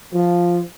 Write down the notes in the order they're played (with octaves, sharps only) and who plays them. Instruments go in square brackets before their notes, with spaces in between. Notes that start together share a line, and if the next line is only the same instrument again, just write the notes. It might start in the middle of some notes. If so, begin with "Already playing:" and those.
[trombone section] F3